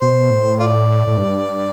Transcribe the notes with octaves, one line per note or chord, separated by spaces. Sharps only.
B2 C5
A2
F4 D5
A2
G2